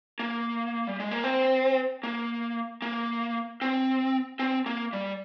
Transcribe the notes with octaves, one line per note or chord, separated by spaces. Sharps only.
A#3
G3
G#3
A#3
C4
A#3
A#3
C4
C4
A#3
G3